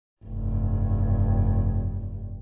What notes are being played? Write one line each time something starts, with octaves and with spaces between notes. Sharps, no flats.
F1 G2